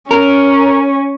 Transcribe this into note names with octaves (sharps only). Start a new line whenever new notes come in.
C#4 A#4